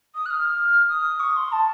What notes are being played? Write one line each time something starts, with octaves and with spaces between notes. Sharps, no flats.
D#6
F#6
F6
D#6
C#6
C6
A5